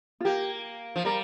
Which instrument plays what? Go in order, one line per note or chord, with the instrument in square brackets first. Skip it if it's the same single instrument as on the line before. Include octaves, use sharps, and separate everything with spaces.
[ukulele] F4
[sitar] A#3 [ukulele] G4
[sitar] F3
[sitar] G3 [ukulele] A#4